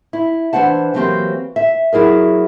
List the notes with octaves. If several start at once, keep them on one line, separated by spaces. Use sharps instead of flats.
E4
E3 G3 D4 C5 F#5 A5
E3 F#3 A#3 C4 G4 C5
E5
F#3 E4 G#4 A#4